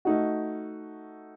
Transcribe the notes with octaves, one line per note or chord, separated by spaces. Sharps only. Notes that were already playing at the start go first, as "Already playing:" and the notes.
A3 D#4 F#4